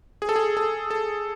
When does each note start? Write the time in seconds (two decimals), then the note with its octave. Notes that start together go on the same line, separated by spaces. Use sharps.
0.22 G#4
0.29 A4
0.36 G#4
0.57 A4
0.91 A4